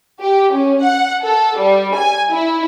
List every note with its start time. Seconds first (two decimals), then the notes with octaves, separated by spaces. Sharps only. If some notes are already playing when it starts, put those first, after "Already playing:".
0.20 G4
0.53 C#4
0.82 F#5
1.23 A4
1.57 G3
1.95 G#5
2.30 E4